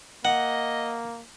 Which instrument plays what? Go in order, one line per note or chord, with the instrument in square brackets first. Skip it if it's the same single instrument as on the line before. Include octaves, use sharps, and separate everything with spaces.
[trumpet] A#3 [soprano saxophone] D#5 [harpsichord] F#5